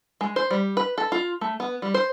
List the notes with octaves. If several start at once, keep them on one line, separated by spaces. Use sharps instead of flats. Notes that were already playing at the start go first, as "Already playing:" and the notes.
G#3
C5
G3
B4
A4
F4
A3
B3
G3
C5